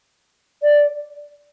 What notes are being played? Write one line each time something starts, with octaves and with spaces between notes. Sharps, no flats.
D5